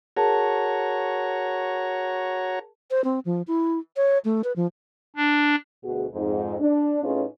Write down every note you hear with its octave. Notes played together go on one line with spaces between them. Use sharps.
F#4 G#4 A#4 C#5 A5 A#5
C5
C4
F3
E4
C#5
A3
B4
F3
D4
D2 B2 F#4 G#4
F2 G#2
D4
A2 C#4 D#4 F4 G#4 B4